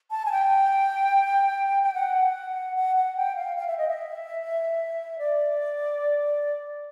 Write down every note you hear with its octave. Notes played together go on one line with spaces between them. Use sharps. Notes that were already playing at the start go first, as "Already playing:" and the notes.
A5
G#5
G5
G5
F#5
F#5
F#5
G5
F5
F5
E5
D#5
E5
D5